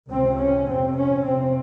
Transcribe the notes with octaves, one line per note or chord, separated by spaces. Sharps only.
C#2 C3 C4
C#4
F2 C3 C4
C#4
F2 C3 C4